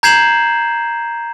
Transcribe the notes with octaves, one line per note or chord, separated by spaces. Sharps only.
A#5 G6 G#6 C7 E7 F#7